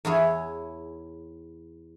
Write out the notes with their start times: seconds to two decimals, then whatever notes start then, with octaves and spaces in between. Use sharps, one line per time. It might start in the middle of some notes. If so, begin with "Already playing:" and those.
0.05 E2 E4 G#4 C#5